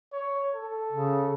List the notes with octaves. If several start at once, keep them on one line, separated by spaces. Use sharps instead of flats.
C#5
A4
C#3